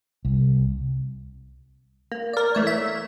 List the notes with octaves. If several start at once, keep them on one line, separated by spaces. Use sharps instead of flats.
C2
A#3
A#4 D5
E3 A3 C#5
E5